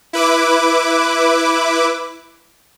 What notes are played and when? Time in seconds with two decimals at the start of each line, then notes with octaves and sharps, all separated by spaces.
0.13 E4 B4 D6